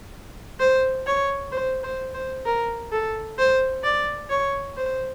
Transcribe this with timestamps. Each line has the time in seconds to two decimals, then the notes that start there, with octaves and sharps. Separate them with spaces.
0.60 C5
1.07 C#5
1.52 C5
1.83 C5
2.14 C5
2.45 A#4
2.92 A4
3.38 C5
3.84 D5
4.30 C#5
4.77 C5